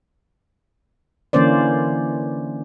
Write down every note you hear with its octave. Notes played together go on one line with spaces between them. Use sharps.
D3 E3 A#3 C#4 C5 D5